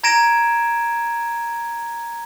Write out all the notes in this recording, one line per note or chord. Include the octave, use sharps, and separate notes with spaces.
A#5 G#6 A#6 D7 E7